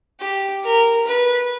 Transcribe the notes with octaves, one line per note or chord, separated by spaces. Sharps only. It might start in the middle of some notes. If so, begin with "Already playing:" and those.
G4
A#4
B4